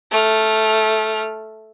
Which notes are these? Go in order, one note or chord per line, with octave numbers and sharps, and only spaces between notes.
A3 F6